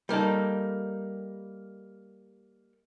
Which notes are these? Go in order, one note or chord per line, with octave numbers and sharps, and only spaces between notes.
G3 A#3 D#4 A4